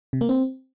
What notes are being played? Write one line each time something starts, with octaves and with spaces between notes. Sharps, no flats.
C3
A#3
C4